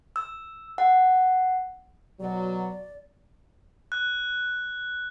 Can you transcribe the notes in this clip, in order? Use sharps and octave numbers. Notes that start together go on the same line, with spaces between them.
E6
F#5
B2 F#3 D5
F#6